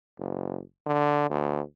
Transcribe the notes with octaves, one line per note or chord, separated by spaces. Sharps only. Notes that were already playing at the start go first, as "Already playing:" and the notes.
F#1
D3
D2